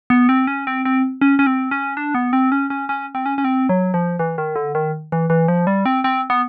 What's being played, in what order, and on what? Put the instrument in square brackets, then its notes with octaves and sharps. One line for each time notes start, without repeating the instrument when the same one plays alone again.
[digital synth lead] B3
C4
C#4
C4
C4
C#4
C#4
C4
C#4
D4
B3
C4
C#4
C#4
C#4
C4
C#4
C#4
C4
F#3
F3
E3
D#3
D3
D#3
E3
E3
F3
G3
C4
C4
B3